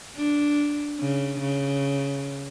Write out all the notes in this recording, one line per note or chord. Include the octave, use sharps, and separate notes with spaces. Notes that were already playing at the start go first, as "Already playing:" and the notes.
D4
C#3
C#3